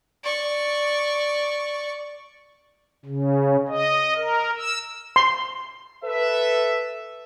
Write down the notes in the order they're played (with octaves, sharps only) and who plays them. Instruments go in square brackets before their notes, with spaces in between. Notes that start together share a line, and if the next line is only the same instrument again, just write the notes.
[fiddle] D5 C#6
[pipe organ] C#3
D#5
A#4
E6
[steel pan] C6
[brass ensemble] A4 B4 E5